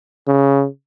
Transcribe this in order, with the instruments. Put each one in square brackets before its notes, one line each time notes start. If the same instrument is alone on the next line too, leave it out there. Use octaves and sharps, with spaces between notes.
[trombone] C#3